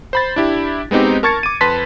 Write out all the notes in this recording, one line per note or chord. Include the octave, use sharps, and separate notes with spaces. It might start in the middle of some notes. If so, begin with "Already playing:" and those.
C5 B5 A6
D4 E4 G4
G#3 B3 C4 D#4 G4
A#4 A5 C#6 G#6 A6 C#7
D6 D#7
F2 B4 A5 C6 A6 B6